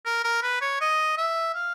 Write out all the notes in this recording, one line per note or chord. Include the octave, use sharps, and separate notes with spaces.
A#4
A#4
B4
C#5
D#5
E5
F5